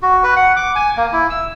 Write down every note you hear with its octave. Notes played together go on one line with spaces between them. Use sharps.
F#4
B4
F#5
D6
G#5
A#3
E4
E6